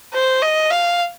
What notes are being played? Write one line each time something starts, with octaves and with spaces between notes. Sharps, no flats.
C5
D#5
F5